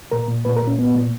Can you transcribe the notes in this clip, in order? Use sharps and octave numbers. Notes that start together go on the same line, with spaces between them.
A#2 A#4
A#2
A#2 B4
A#4
A#2
C#4
A#2 B3
A#2